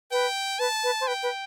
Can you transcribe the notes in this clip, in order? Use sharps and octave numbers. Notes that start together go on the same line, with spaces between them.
B4 G5
B4 A5
B4
C5
B4 G5
B4